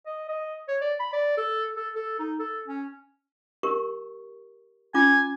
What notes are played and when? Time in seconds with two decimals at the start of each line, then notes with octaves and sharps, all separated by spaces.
0.06 D#5
0.29 D#5
0.68 C#5
0.81 D5
1.00 B5
1.13 D5
1.37 A4
1.76 A4
1.96 A4
2.19 D#4
2.39 A4
2.68 C#4
3.63 G4 A#4 C#6
4.94 C#4 F4 G#5 D6